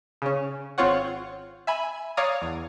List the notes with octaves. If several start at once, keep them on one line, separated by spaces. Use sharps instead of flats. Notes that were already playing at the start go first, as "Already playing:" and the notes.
C#3 C#4
G#1 C4 F4 C#5 F#5
E5 G#5 B5
C#5 D5 F5 A#5 D#6
E2